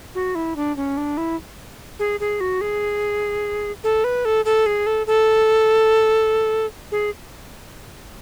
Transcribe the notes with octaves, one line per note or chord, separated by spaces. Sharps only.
F#4
E4
D4
C#4
D4
E4
G#4
G#4
F#4
G#4
A4
B4
A4
A4
G#4
A4
A4
G#4